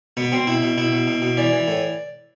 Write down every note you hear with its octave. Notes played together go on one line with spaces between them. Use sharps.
B2 B3
B2 C4
B2 E4
B2
B2 E4
B2
B2
B2
E3 D5
E3
A2